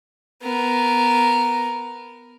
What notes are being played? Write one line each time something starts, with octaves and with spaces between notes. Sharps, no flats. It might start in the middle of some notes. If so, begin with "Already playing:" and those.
B3 A#4